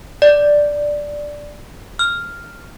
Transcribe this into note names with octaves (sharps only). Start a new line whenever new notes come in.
D5
F6